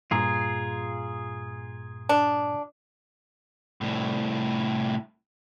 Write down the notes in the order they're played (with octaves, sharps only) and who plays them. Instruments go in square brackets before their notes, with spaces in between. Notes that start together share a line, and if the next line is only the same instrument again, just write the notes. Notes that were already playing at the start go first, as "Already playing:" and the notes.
[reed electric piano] G2 A#2 A#5 [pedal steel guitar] F4 G#4
[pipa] D4
[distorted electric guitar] C2 A2